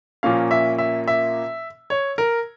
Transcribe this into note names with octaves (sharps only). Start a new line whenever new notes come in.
A#2 F3 A#3 C#4 F5
E5
E5
E5
C#5
A#4